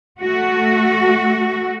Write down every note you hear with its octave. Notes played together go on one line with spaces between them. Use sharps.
A3 F#4